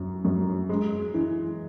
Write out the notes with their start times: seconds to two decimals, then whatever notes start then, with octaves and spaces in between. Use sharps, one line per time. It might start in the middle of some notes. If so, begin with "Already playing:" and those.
Already playing: F#2
0.25 F#2
0.69 G#3
1.14 E3